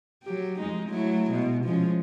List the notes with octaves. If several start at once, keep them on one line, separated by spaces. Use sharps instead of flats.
F#3 G4
F2 G#3 D#4
F#3 A3 E4
B2 G#3
F3 G#3 C#4